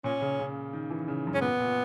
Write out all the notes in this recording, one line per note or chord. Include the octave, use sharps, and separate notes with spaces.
A#2 C#4
C#3
C#3
D#3
E3
C#3
F#2
G#2 C#4
A#2 B3
A#2